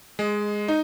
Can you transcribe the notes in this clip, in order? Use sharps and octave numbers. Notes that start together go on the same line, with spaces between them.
G#3
D#4